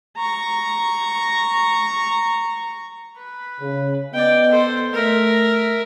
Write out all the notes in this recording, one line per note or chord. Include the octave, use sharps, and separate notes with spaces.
A#5 C#6
B4
C#3
B3 D5 D#5 G5
A4 C5
A3 A#4 E5